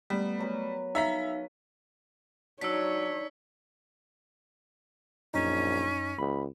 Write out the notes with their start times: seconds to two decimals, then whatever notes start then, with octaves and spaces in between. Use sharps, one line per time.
0.10 G3 A3 B3
0.39 F#3 A#4 B4
0.95 D#4 E5 F5 A#5 B6
2.61 F#3 D4 D#4 C#5 E6 B6
5.34 A#1 F#2 C#4 D#4
6.19 C#2 B5